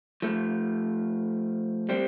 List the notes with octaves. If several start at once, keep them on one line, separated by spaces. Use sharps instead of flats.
F3 A3
G3 C4